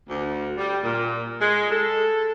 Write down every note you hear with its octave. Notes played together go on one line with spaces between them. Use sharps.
D2
G3
A#2
G#3
A4